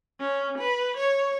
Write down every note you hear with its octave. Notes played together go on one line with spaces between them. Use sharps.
C#4
B4
C#5